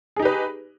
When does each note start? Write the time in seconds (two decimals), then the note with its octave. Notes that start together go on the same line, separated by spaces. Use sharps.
0.16 G#4
0.19 D#4
0.22 G4
0.25 B4